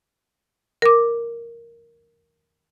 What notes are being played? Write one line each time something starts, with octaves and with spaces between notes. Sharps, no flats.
A#4 D6